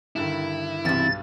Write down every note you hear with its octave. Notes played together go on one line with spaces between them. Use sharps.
G2 D3 D#3 E4
B1 E2 G2 C3 A6